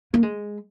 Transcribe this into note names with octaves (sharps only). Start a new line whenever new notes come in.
A#3
G#3